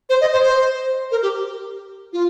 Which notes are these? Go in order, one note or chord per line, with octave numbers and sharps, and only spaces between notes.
C5
D#5
C5
C5
A#4
G4
F4